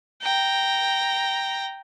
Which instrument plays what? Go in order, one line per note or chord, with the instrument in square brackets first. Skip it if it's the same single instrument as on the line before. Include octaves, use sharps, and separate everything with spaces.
[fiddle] G5 A#5